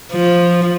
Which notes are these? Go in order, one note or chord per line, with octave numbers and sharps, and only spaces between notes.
F3